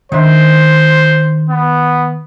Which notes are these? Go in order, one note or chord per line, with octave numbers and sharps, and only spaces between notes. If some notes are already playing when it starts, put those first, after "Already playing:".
D#3 D4 C5 E5
B3